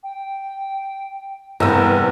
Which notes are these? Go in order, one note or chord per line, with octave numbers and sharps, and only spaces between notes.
G5
E2 G2 C3 A#4 E6